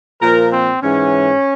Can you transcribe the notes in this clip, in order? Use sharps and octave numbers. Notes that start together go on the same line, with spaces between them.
A#2 F3 A#4
C4
G#2 E3 C#4